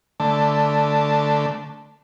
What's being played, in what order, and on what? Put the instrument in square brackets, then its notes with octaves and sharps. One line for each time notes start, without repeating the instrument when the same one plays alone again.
[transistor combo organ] D3 A3